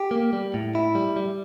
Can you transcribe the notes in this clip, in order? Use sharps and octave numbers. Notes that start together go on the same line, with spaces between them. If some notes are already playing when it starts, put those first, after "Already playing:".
Already playing: G4
A#3
G3
A2
E4
G3
G3